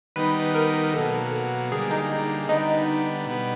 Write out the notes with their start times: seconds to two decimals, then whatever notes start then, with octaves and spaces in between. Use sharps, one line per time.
0.16 D#3 G3 B3 D#4 B4
0.54 A#4
0.94 B2 F#3 A#3 A4
1.71 D3 G3 A#3 G#4
1.91 D#4
2.49 D3 G3 B3 D#4
3.27 B2 G3 B3